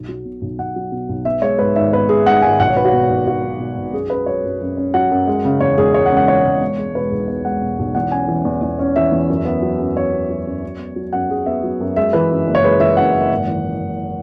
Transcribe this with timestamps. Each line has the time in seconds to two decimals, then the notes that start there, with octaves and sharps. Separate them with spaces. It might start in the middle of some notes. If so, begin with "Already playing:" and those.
Already playing: B1
0.08 F#3
0.25 B2
0.41 B1
0.59 B1 F#5
0.76 F#3
0.92 B2
1.09 B1
1.25 B3 E5
1.42 G#3 C#5
1.59 G#2 B4
1.76 G#1 E5
1.92 B3 B4
2.09 G#3 G#4
2.26 G#2 F#5
2.42 G#1 G#5
2.59 B1 F#5
2.68 C#5
2.76 F#3 B4
2.85 F#4
2.93 B2
3.09 B1
3.26 B1 F#4
3.43 F#3
3.60 B2
3.77 B1
3.93 F#2 G#4
4.10 C#4 B4
4.26 F#3 C#5
4.44 F#2
4.61 F#2
4.77 C#4
4.94 F#3 F#5
5.11 F#2
5.28 G#3
5.45 C#3
5.60 E2 C#5
5.77 E1 G#4
5.94 G#3 C#5
6.06 F#5
6.11 C#3
6.17 F#5
6.28 E2 C#5
6.45 E1
6.61 B3
6.79 G#3
6.95 B2 B4
7.11 B1 G#4
7.28 B3 B4
7.45 G#3 F#5
7.62 B2
7.79 B1
7.95 E2 F#5
8.11 C#4 G#5
8.28 E3
8.45 E2
8.62 E2
8.79 C#4
8.96 E3 E5
9.12 E2
9.30 F#2
9.45 B3
9.62 F#3
9.80 F#2
9.97 F#2 C#5
10.13 B3
10.30 F#3
10.47 F#2
10.64 F#2
10.79 B3
10.96 F#3
11.13 F#2 F#5
11.30 F#2 G#4
11.46 B3 E5
11.63 F#3
11.81 F#2
11.96 G#3 E5
12.13 E3 B4
12.31 F#2
12.47 F#1
12.55 C#5
12.64 G#3 B4
12.80 E3 E5
12.97 F#2 F#5
13.14 F#1
13.30 G#1
13.48 E3
13.65 F#2
13.81 G#1